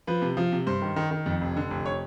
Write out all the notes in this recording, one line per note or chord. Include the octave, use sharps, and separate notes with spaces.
F3 B4
C3
F3
C3
G2 C5
D#3
D#3
D#3
F2
F1
D3
F1
C#5